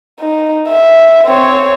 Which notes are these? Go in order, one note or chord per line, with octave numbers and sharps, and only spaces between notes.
D#4
E5
C4 C#5